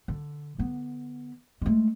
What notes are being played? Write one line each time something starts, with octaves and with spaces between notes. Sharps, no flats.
D3
D3 B3
G#3 A3